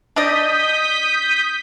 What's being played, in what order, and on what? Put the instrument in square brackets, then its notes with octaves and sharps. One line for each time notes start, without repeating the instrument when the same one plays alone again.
[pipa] D4 D5 D#5 [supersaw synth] D#6 G6 B6